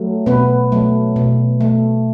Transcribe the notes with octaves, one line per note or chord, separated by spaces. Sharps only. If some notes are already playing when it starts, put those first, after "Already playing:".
Already playing: F#3 A3
B2 B3 B4
F#3 A3
B2
A3